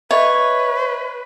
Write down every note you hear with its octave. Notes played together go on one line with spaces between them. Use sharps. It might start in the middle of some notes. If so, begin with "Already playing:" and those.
B4 C#5 D#5 E5